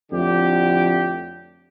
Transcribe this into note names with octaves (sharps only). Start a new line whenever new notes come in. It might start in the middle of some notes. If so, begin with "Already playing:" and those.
F2 A2 D3 A3 G4